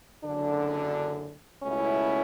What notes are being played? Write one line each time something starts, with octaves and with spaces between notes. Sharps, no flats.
F#1 F#2 D3 D4
C#2 B2 A3 C#4 E4